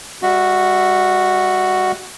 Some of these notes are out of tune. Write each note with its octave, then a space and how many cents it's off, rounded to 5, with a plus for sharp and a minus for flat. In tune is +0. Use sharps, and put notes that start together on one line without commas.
G3 +35 F#4 +0 E5 +0